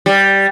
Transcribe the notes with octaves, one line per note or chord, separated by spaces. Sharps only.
G3